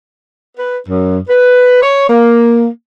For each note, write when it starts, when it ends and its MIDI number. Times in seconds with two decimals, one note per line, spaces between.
0.58 0.78 71
0.88 1.19 42
1.29 1.81 71
1.82 2.05 73
2.10 2.67 58